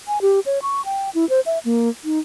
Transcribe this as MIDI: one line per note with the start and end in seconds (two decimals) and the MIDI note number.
0.08 0.21 80
0.22 0.40 67
0.46 0.59 73
0.62 0.84 85
0.85 1.10 79
1.15 1.28 64
1.29 1.40 72
1.46 1.59 76
1.65 1.89 58
2.04 2.19 63